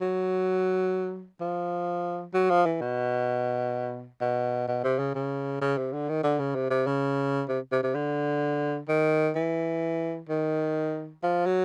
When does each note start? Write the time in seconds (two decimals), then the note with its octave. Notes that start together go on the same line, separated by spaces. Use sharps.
0.01 F#3
1.41 F3
2.34 F#3
2.50 F3
2.66 E3
2.81 B2
4.21 B2
4.68 B2
4.84 C3
4.99 C#3
5.15 C#3
5.61 C#3
5.78 C3
5.93 D3
6.09 D#3
6.23 D3
6.39 C#3
6.55 C3
6.71 C3
6.87 C#3
7.49 C3
7.72 C3
7.83 C3
7.95 D3
8.88 D#3
9.36 E3
10.29 D#3
11.23 F3
11.46 F#3